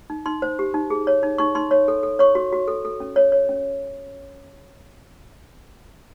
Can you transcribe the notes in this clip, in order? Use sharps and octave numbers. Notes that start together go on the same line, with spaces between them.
D#4
D#4 C6
C5
G4
D#4
G#4
C#5
D#4
D#4 C#6
D#4 C6
C#5
A4
A4
C#5 C#6
F#4
F#4
A4
A4
C#4
C#5
C#5
C#4